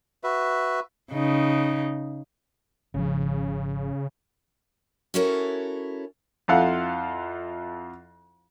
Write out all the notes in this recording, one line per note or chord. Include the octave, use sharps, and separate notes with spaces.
F#4 B4 E5
C#3 D#4
G#1 C#3 F3
C#4 E4 F#4 A4 A#4 C#5
F2 E4 F4 A4 F5 F#5